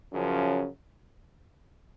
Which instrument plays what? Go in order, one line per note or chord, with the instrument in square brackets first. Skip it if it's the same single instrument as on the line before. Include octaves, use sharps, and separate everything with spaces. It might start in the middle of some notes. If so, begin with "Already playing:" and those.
[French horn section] F#2 C#3 F3